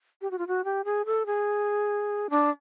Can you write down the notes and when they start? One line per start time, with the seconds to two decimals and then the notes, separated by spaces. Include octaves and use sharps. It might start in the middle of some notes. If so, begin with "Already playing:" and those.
0.21 G4
0.31 F#4
0.38 F4
0.47 F#4
0.64 G4
0.85 G#4
1.06 A4
1.26 G#4
2.30 D4